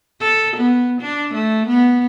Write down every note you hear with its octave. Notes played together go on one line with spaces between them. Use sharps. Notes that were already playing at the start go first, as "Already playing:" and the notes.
A4
B3
D4
A3
B3